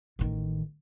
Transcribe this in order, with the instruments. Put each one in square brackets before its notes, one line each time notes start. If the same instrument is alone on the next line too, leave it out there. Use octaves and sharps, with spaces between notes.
[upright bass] A1 D#3